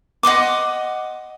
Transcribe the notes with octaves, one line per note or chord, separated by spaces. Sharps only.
D#5 F#5 C6 D6